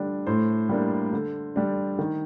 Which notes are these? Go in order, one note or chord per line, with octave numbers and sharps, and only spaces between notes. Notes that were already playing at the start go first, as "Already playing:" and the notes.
Already playing: D3 G3 D4
A2 C5
G3 A#3 D4
D3
G3 D4
D#3